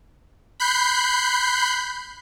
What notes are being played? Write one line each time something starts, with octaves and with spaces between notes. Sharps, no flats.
B5 F#6 G6 C7